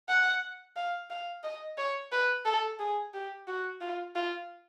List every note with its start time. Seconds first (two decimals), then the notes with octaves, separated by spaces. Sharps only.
0.09 F#5
0.76 F5
1.10 F5
1.43 D#5
1.78 C#5
2.12 B4
2.46 A4
2.79 G#4
3.14 G4
3.47 F#4
3.81 F4
4.15 F4